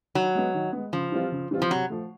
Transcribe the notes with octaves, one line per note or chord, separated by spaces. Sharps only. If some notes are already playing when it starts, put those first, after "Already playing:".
D#3 F#3
G#3 B3
D#3
G#3 B3
C#3 F3
E3 G3 C4 F4
C#3
E3 G3 C4 F4
F3
C3 F#3
F3 A3